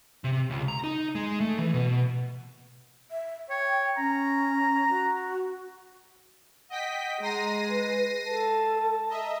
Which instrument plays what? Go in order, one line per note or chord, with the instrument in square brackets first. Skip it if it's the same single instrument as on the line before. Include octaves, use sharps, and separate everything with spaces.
[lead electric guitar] C3
C#2
A#5
D#4
G#3
A3
E3
B2
[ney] E5
[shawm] C#5 [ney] G5
[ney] C#4 [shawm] A#5
[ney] F#4
[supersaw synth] D#5 G5 B6 [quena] F#5
[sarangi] G#3 [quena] A#5 [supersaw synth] A#6 C7 D#7
[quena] B4
[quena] A4 [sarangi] A5
[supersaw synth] D#5 E5 [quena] A#5